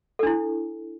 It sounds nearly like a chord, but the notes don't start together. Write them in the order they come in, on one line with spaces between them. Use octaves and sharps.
A4 D4 E4